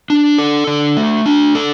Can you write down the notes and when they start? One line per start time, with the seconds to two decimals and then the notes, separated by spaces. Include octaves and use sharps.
0.10 D4
0.38 A4
0.67 D3
0.97 A3
1.26 D4
1.55 A4